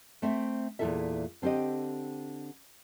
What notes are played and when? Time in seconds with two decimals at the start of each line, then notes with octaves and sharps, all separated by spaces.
0.22 A3 C4 E5
0.79 E2 A#2 D#3 E4 A4 E5
1.42 D3 C4 F4 G4 D#5